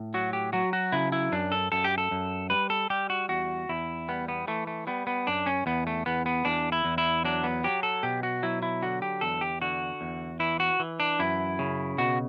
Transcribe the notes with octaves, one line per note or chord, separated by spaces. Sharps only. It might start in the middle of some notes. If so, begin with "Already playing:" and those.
Already playing: A2
F#3 F#4
G4
F#3 F#4
F#4
C#3 E4
E4
F#2 D4
A4
F#2 A4
G4
A4
F#2
G3 B4
A4
G3 G4
F#4
E2 F#4
E2 E4
G3 B3
B3
E3 A3
A3
G3 B3
B3
F#2 D4
C#4
E2 B3
A3
E2 B3
B3
E2 D4
E4
E2
E4
F#3 D4
B3
F#3 G4
A4
B2 G4
F#4
F#3 E4
E4
D3 F#4
G4
E2 A4
G4
D3 F#4
E2
E3 E4
F#4
E3
D4
F#2 E4
C#3
B2 F#4